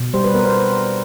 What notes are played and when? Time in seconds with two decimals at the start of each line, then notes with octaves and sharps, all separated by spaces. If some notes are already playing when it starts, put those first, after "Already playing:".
Already playing: B2
0.14 G3 C5
0.24 B4
0.34 B3 A#4
0.45 C5